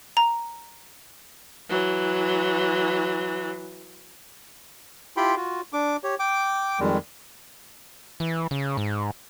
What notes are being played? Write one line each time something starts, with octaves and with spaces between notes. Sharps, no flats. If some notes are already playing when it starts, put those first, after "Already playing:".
A#5
E3 F#3
E4 F4 G4 G5 B5 C6
F4 F#4
D4 D6
G4 C#5
G5 D6
F2 D#3 G3 G#3
E3
C#3
G#2